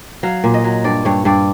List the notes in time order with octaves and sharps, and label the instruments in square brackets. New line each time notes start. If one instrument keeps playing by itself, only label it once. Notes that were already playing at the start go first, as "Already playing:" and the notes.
[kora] F#3 F5
A#2
D#5
F#3
G2 D5
G2 C#5
G2 D5